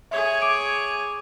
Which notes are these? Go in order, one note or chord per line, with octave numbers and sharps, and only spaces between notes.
G#4 C#5 E5
D6 D7